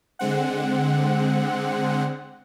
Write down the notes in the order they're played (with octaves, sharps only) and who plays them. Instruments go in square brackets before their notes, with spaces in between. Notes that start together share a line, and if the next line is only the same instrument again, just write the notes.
[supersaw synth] D3 G#3 C4 F#5